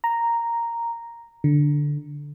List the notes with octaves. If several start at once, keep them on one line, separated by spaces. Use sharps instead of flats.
A#5
D3